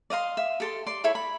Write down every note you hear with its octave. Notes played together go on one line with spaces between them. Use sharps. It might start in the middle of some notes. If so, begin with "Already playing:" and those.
D5 D#5 F5 C6
E5
G4 A4 C6
D5 C6
E4 A4 C#5 E5
B5